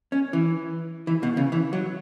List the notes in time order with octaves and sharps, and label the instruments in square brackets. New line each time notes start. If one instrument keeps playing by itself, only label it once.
[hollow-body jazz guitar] C#4
E3
E3
B2
C#3
E3
F#3